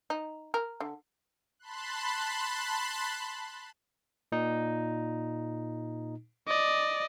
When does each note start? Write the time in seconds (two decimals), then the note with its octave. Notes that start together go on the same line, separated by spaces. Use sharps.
0.10 D#4
0.54 A#4
0.80 D3
1.59 A5 B5 C6 F#6
4.32 A#2 D#4
6.48 D5 D#5